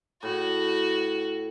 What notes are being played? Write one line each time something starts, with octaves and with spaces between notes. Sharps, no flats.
A2 F#4